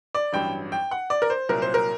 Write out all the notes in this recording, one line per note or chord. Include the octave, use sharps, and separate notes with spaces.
D5
A1 G2 F#3 G5
G5
F#5
D5
A#4
C5
C2 A#2 F#3 A#4
C5
A#4